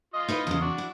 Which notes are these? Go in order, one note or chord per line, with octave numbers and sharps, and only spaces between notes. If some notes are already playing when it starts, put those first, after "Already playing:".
F4 D#5
D#4 E4 B4
E2 C#3
D4 F#4
E4